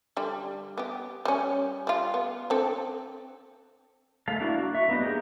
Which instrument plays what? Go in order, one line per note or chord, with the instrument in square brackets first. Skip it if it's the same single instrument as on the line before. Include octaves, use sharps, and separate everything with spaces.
[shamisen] D3 G3
B3 G4
G3 C#4
G3 F4
B3
D3 C4 A4
[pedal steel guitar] A3 A4 F5 A5
A#3 D4 E4 F#4
F#4
E5 C#6
A#3 B3 D4 D#4 F#4
A#3 G4 G#4 A#4 G5